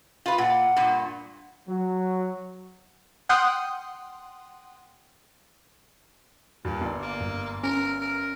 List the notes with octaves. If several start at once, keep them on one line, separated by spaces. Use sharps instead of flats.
F4 B4
A#2 F#5
G2 A#2
F#3
F#5 G5 C6 D#6 F6
G2 A#2
G1 D5
A#3
G2
C#4 A#4
A#4